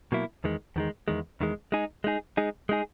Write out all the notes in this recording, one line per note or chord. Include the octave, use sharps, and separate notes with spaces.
B2 F#3 A#3 E4
E2 D#3 G#3
E2 D#3 G#3
E2 D#3 G#3
E2 D#3 G#3
G#3 D#4 G#4
G#3 D#4 G#4
G#3 D#4 G#4
G#3 D#4 G#4